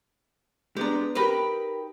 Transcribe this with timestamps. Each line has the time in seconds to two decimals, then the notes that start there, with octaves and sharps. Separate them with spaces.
0.77 G#3 B3 D4 G4 A#5
1.15 D#4 G4 A#4 B4 G5 B5